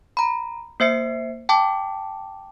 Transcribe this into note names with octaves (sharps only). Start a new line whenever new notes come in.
A#5 B5
A#3 C5 E5 C7 C#7
G5 A5 D6